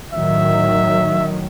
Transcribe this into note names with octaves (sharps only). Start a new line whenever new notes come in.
A2 D#3 F#3 E5